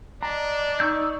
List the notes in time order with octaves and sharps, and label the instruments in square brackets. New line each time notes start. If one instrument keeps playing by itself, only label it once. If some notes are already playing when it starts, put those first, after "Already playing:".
[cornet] D4 [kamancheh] D5 D#5 [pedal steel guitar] A#5
[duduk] D#4 [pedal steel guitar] C#6 E6 G6